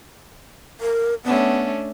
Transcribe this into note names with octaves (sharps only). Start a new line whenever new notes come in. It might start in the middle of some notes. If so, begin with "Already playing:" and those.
A#4
A3 B3 C#4 D4